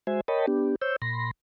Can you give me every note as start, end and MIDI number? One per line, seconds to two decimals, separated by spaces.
0.07 0.21 56
0.07 0.21 66
0.07 0.21 72
0.07 0.21 76
0.07 0.21 80
0.28 0.46 70
0.28 0.46 73
0.28 0.46 75
0.28 0.46 79
0.28 0.46 81
0.28 0.46 83
0.47 0.76 59
0.47 0.76 62
0.47 0.76 67
0.82 0.96 72
0.82 0.96 73
0.82 0.96 88
0.82 0.96 91
1.02 1.31 46
1.02 1.31 83
1.02 1.31 84
1.02 1.31 94